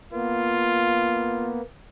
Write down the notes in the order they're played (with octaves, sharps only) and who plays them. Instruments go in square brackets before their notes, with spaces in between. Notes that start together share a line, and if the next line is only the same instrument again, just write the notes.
[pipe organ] A#3 B3 [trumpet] F4